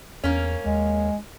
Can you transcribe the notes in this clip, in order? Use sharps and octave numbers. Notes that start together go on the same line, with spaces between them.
E2 A#3 C#4
D#2 G#3